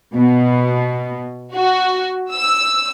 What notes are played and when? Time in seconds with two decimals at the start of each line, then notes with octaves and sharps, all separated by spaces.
0.14 B2
1.55 F#4
2.32 E6